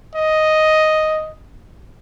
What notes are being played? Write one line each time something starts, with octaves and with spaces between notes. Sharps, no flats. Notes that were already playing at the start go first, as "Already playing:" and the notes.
D#5